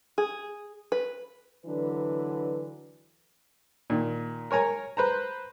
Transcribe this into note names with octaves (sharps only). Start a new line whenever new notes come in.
G#4
B4
D3 E3 F#3 D4 B4
A#2 D#3
A#4 C#5 G#5 A#5
B4 C5 A#5